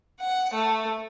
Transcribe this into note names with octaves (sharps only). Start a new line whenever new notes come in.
F#5
A3